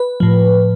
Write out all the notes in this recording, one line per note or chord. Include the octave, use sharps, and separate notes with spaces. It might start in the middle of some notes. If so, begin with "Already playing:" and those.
Already playing: B4
A2 F3